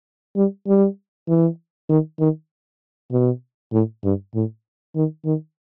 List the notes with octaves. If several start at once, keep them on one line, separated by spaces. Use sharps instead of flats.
G3
G3
E3
D#3
D#3
B2
A2
G2
A2
D#3
D#3